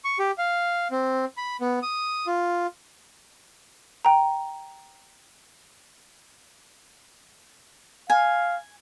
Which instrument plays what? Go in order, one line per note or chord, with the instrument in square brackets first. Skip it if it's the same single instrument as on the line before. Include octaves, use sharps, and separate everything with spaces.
[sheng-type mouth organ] C#6
G4
F5
C4
B5
B3
D#6
F4
[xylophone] G5 A#5
[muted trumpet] F5 [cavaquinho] G#5